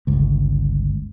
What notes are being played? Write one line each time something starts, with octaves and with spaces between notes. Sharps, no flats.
G1 C#2